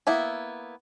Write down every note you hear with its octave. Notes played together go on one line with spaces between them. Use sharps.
A#3 B3 E4